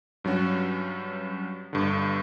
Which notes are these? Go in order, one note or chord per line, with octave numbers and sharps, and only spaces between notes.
G2 F#3 C#4 F#4
G1 G2 D3